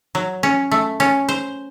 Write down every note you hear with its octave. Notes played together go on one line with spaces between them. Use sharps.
F#3
C#4
A3
C#4
C5